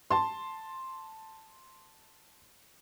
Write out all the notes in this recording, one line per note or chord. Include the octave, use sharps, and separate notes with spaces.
A5 C6